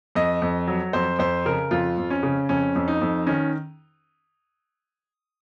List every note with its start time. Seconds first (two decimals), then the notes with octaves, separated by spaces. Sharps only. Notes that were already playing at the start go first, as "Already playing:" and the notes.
0.15 F2 D#5
0.42 F2
0.67 F#3
0.93 F2 C5
1.19 F2 C5
1.46 C#3 A#4
1.71 F2 F4
1.98 F2
2.10 C#4
2.23 C#3
2.49 F2 C#4
2.76 F2
2.88 D#4
3.02 F2
3.27 D#3 C#4